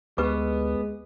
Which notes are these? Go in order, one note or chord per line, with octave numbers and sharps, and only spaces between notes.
D2 G#3 B3 G4 B4 D6